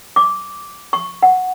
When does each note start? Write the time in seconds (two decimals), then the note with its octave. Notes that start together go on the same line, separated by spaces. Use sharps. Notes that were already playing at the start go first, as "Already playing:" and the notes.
0.16 D6
0.93 C#6
1.23 F#5